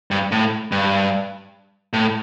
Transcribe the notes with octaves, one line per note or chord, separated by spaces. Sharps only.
G2
A2
G2
A2